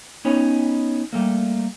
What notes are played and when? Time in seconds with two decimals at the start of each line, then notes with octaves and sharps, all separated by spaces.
0.25 B3 C#4 D#4 C#5
1.13 G3 A3 A#3